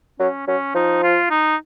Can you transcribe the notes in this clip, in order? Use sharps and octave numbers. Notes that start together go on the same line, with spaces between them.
F#3 C#4
F#3 C#4
F3 D#4
F4
D#4